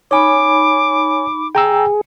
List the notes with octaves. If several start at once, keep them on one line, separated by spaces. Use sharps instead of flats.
D#4 C#5 G#5 B5 D6
G#4 G5 A#5 E6